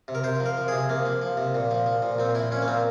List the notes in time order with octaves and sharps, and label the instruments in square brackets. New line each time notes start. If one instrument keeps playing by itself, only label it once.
[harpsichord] C3
A#4
C3 C5
F3
A#4
F3
C3 G#4
C3 A#3
F3
F3
C3
A#2
F3
F3
A#2
A#2 C4
F3 E4
F3 C#4
A#3
A#2 C4